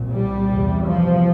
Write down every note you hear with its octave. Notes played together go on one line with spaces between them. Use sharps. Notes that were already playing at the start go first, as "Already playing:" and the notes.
Already playing: C2 A#2
G3
E2 C3
F3